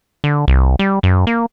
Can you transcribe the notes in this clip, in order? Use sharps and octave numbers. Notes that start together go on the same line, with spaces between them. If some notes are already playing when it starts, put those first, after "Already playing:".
D3
C2
G3
F#2
A#3